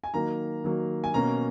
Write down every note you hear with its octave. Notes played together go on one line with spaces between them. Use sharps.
G#5
D#3 F#3 A#3 A#5
D#3 F#3 A#3
G#5
B2 A#3 C#4 A#5